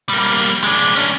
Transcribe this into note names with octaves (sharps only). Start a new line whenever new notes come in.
G3 A#3
G#3 D4
C#4 D4